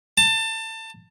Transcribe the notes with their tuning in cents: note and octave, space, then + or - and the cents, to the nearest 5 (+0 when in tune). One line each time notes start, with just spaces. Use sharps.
A5 +25